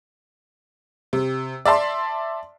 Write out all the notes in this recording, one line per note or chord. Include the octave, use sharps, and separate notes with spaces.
C3
D5 E5 A5 C6